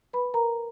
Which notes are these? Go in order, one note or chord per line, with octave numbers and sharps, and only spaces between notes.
B4 B5
A#4 A#5